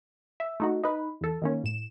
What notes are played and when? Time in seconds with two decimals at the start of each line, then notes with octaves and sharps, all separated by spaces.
0.40 E5
0.60 A3 D#4 F#4
0.84 D#4 B4
1.21 E2 A4
1.42 D#3 A#3 C#4
1.64 A2 E7